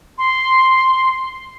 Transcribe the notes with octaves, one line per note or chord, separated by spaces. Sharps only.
C6